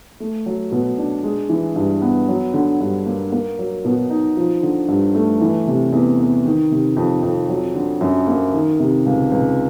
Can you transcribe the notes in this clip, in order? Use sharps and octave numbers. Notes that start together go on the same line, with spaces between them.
A3
F#3
B2
D4
G#3
E3
G2
B3
F#3
D3
G2
A#3
A#3
F#3
B2
D#4
F3
D3
G2
A3
E3
C3
E2
E2
D#3
C3
F2
F2
F#3
D3
F#2
A#3
D#3
C3
C#2
C#2